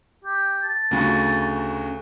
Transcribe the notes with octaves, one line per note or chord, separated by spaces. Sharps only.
G4
A5
D2 C#3 F#4